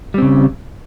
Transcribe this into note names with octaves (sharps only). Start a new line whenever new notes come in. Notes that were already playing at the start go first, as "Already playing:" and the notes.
C#3 G3 C4